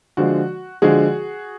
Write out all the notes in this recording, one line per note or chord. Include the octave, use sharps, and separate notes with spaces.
D3 F3 G#3 F#4
D3 F3 G#3 F#4 G#4